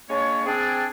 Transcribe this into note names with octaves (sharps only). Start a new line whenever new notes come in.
G#3 A#3 D4 C#5
C4 D4 G#4